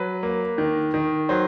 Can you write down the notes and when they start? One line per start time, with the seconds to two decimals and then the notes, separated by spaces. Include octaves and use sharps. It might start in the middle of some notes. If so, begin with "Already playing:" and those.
Already playing: F#3 B4
0.23 A#3
0.58 D#3
0.94 D#3
1.29 F#3 C5